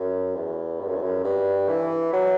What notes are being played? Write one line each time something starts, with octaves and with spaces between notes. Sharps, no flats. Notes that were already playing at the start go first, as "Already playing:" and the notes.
Already playing: F#2
E2
G2
F#2
E2
F#2
G2
E3
F#3